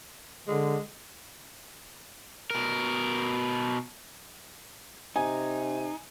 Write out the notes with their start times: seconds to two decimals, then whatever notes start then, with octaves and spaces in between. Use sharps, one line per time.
0.48 D3 G#3
2.51 B2 A#4
5.16 C3 D#4 G#5